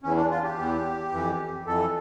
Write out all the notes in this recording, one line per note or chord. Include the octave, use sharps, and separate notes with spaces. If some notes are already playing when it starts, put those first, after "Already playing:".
E2 E3 C#4
D4
F4
G4
E2 E3
F2 E3
F2 E3 A4